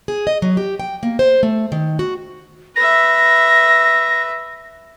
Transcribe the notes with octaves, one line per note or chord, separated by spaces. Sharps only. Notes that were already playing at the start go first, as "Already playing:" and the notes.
G#4
D#5
F#3
G4
G5
A#3
C5
A3
D#3
F#4
B4 E5 A#6